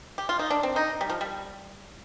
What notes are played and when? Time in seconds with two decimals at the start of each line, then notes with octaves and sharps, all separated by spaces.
0.18 G4
0.29 F4
0.39 D#4
0.50 D4
0.63 C4
0.76 D#4
1.01 G3
1.10 F3
1.21 G3